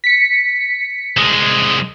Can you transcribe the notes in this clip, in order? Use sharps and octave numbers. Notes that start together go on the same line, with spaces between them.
B6 C#7
C2 G#3